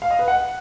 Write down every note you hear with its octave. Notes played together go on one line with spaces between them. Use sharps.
F5
D#5
B4
F#5